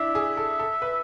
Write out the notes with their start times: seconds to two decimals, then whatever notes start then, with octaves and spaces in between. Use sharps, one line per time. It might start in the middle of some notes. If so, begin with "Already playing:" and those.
Already playing: D4 E4 E5
0.15 G#4
0.37 A4
0.59 A4
0.82 B4